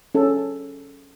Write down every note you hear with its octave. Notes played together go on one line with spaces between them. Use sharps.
C#4 A4